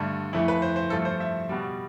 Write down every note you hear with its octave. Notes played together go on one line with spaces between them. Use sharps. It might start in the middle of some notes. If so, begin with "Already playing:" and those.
Already playing: G2 D3 A3
F2 E3 A3 E4
B4
C5
C5
G2 F3 A3 A4
C5
E5
B2 G3